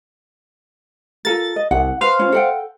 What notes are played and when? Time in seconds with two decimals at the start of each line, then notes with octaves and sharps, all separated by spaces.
1.25 F4 A4 A#4 A6
1.56 D#5
1.71 C2 F#5
2.01 B4 C5 F5
2.19 C#4 F4
2.32 A4 F#5 G5